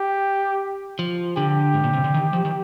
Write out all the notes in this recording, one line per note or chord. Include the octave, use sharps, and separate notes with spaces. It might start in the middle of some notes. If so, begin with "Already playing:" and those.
Already playing: G4
F3
D3 G4
G#2
A#2
C3
D3
D#3
F3
D#3